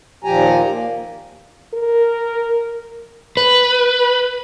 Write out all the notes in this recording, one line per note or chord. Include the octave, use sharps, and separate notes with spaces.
D#2 A#2 F3 G4 G#5 A#5
A#3
A#4
B4